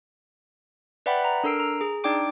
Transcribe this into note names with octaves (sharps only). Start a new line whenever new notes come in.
B4 D5 E5 F#5 G5 B5
A#5
D4 A4 A#4 E6 C7 D7
A#5
G#4
D4 D#4 D5 G5 D6 D7